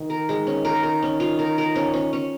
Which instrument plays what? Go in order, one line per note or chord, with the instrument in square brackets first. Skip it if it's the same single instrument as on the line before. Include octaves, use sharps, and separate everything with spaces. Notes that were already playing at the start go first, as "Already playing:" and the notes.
Already playing: [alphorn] D#3
[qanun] A#4
G#3
C#4
A#4
A#4
C#4
F4
A#4
A#4
C#4
C#4
C#4